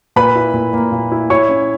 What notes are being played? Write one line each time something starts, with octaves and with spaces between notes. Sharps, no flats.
A#2 B4 B5
E4
A#2
A#3
A#2
E4
E4 C#5 C#6
C#4